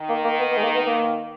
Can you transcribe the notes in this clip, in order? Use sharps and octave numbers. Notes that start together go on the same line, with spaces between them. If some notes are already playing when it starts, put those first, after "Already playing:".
Already playing: D#3
A#3
A#3
B3
B3
G#3
A#3
B3
A#3